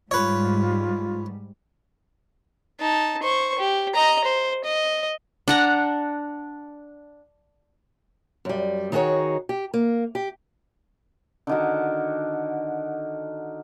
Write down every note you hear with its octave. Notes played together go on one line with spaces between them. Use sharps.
G#2 G3 F4 B4 C#5
D#4 A5
C5 C#6
G4
D#5 A#5
C5
D#5
D4 F#5 A#5
F#2 G3
D#3 D#4 F#4 G#4 C#5
G4
A#3
G4
D3 D#3 F#4